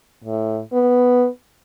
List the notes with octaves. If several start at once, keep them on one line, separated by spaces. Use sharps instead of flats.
A2
B3